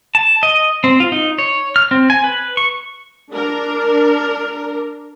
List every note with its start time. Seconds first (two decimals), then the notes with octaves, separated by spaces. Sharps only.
0.15 A5
0.43 D#5
0.84 C4
1.00 F4
1.12 D#4
1.38 C#5
1.76 F6
1.91 C4
2.10 G#5
2.24 B4
2.57 C#6
3.32 D4 A#4